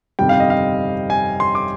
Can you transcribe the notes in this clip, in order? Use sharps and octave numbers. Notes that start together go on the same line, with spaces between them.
G1 F2 C3 D#3 G3 G5
F5
D#5
F5
G#5
C6
D6